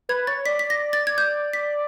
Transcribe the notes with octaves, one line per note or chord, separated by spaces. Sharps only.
B4 G#6
C#5 A6
D5 B6
B6
A#6
A6
G#6
G6
B6